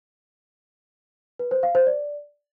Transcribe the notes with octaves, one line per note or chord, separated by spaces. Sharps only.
B4
C5
F5
C5
D5